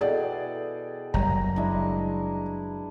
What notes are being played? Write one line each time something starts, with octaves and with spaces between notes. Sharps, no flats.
B2 E3 G#4 A4 D5 G5
F#1 G3 A#5
G#3 D4 E4